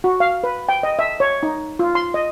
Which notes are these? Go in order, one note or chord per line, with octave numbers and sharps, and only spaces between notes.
F#4
F5
B4
G5
D#5
E5
C#5
D#4
F4
C6
D#5